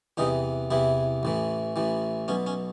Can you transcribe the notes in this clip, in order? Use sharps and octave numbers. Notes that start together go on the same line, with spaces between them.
E2 C3 E3 D#4
E2 C3 E3 E4
A1 A2 E3
A1 A2 E3
B1 B2 C#4
C#4